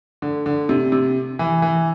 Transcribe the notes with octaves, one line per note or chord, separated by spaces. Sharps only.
D3
D3
C3
C3
E3
E3